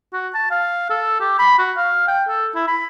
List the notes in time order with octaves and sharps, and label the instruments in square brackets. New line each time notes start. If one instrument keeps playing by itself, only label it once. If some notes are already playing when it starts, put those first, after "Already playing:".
[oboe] F#4
A5
F5
A4
G4
B5
F#4
F5
G5
A4
E4
B5